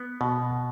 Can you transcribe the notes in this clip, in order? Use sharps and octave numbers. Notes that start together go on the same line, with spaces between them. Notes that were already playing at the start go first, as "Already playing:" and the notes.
Already playing: B3
B2